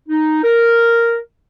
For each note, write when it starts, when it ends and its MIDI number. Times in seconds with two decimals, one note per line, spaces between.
0.08 0.42 63
0.43 1.17 70